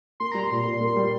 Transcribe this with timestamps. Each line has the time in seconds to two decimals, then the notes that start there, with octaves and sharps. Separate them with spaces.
0.20 A#3 C6
0.32 G3 A#5
0.43 C6
0.51 A#2
0.66 A#2
0.81 A#3
0.96 G3